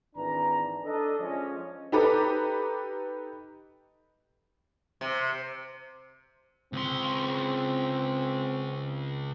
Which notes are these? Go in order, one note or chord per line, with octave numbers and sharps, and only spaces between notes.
G#1 E3 D4 A#5
D4 A4 D#5
F3 G#3 C#4
D#4 G4 A4 B4 A#5 D6
C3
C#2 C4 C6